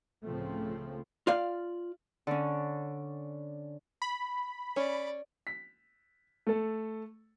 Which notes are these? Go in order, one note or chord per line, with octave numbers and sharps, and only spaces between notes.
C#2 A2 C#3 F3 A3 C4
F4 D5 F5
D3 C#4
B5
C#4 D5
B6
A3 A4